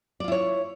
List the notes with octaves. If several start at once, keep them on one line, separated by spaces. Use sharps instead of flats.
E4 F4 C#5 D5